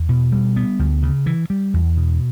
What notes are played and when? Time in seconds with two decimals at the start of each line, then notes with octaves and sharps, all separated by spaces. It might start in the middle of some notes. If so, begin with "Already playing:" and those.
Already playing: E2
0.09 B2
0.32 G3
0.56 B3
0.79 D2
1.03 C#3
1.26 E3
1.50 G3
1.74 E2
1.97 B2